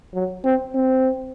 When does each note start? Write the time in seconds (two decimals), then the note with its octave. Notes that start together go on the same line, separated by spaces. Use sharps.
0.14 F#3
0.45 C4
0.75 C4